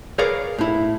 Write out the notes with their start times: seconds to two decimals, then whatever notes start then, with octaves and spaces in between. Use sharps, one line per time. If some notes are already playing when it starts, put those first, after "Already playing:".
0.18 G#4 A#4 B4 C#5 D5 F5
0.58 A2 E4